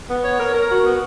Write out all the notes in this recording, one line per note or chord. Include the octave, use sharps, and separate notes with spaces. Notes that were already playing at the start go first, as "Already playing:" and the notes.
B3
C#5
A#4
A#4
F#4
B3